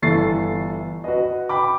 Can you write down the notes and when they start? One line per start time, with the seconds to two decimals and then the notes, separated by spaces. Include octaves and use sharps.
0.02 G1 E3 A4 C#6 A6 C7
1.04 F#4 B4 D#5
1.49 G5 B5 D6